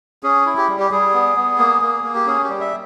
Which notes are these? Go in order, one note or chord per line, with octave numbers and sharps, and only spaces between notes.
C#4 G#4
E4
G4
G3
G4
G3 G#4
B3
B3
A#3
A#3
A#3
G4
C#4 G#4
G4
G3
E5